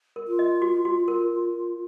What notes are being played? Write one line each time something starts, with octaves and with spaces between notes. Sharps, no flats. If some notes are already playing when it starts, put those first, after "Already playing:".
A#4
F4
D#5
F#4
F#4
A#4